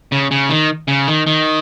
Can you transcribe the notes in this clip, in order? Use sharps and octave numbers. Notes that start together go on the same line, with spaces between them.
C#3
C#3
D#3
C#3
D#3
D#3